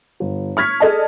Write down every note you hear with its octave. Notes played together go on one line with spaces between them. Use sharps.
G1
C#6 F6 G#6 B6
G#4 A4 D5 D#5 A5